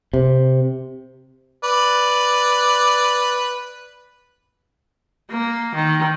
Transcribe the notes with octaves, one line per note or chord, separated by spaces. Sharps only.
C3
B4 D5
A#3
D#3